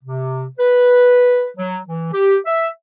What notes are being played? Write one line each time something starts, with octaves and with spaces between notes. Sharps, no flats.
C3
B4
F#3
E3
G4
E5